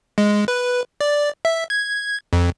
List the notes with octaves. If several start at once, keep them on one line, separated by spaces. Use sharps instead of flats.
G#3
B4
D5
E5
G#6
F2